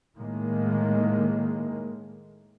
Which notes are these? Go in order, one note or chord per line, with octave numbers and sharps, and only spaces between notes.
A2 D#3 G#3 A#3